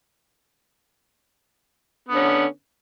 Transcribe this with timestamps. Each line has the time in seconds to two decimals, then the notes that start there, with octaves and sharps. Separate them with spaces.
2.08 B3
2.12 D3
2.15 C#4